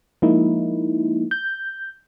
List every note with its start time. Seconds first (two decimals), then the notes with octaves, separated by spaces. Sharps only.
0.22 F3 G#3 A#3 D#4 E4
1.31 G6